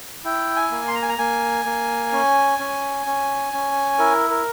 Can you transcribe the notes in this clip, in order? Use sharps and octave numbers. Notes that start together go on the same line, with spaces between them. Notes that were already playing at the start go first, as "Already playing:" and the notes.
E4 G5
G#5
A#3
C6
A#5
G#5
A#5
A#3 G#5
A#3
C#4
C#4
C#4
C#4
E4 A#4
A#4